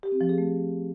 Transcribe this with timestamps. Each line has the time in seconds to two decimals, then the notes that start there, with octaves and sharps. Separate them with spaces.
0.03 G4
0.12 C4
0.21 F3
0.29 G#4
0.38 A3